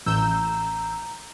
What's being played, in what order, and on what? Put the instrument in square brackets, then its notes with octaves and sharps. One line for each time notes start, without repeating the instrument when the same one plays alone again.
[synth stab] A1 E6 G6 [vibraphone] A#5